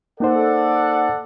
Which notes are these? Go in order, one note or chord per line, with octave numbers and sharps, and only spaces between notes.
A#3 D#4 A4 C5 D5 F#5